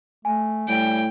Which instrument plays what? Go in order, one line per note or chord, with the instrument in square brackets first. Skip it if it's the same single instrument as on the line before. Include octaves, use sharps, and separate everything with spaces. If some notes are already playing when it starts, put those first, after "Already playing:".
[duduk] A3 [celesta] G#5
[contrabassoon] A2 [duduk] G3 [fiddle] G5